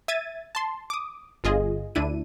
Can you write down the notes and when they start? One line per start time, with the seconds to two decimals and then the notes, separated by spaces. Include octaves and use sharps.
0.08 E5 G#6 A6 D#7
0.55 A5 C6
0.90 D6 D#6
1.44 G1 F4 G#4 D#5
1.95 D2 D4 E4 D#7